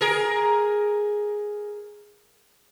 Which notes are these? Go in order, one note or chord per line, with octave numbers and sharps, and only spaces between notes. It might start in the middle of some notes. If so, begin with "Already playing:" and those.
G#4 A#4